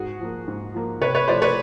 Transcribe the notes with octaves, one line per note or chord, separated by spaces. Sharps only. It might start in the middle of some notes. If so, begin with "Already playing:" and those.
Already playing: G#2 F#4 G#4
F3 A#3
G#2
F3 A#3
C3 B4 C#5
B4 C#5
F3 A3 C5 D5
B4 C#5